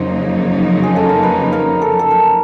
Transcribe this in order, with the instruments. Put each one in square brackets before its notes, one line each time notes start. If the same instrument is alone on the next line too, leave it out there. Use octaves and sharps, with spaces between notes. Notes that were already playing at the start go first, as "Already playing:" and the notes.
Already playing: [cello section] F2 C#3 F#3 A#3 D#4 [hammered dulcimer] C5
[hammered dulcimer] G#4
A4
A#4
B4
A#4
A4
A4
A#4